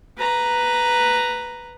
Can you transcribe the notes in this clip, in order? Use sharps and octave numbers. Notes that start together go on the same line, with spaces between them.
B4 A#5